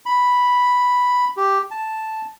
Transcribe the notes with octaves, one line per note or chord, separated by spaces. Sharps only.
B5
G4
A5